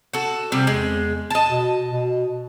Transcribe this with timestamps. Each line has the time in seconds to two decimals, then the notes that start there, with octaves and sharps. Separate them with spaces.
0.13 F#4 A4
0.52 C3 G3
0.67 E2 G#3
1.30 D#5 A5
1.47 B2
1.91 B2